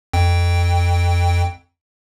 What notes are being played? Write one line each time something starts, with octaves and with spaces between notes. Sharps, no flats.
F2 G5